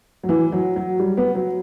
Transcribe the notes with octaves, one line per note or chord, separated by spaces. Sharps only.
F#3
E3
F#3
F#3
G3
B3
F#3